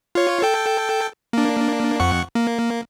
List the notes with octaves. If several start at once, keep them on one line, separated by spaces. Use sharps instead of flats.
F4 C#5
A4 G5
A#3 D4
F2 F#5 C#6
A#3